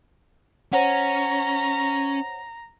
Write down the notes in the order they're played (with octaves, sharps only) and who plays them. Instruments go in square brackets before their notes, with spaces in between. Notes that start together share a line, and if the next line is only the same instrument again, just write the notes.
[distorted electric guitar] C#4 [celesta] C5 C#5 F#5 [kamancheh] A#5